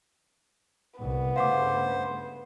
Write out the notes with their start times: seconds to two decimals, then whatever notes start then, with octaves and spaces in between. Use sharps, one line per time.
1.00 C2 B3
1.36 G2 C#3 A3 C5 F5 F#5 D6